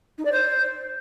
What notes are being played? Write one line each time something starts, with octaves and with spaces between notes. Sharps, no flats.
D#4
D5
C5